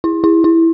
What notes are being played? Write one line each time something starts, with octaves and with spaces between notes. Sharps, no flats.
E4
E4
E4